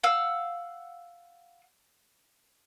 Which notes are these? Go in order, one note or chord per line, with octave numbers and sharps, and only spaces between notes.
F5 F#5 E6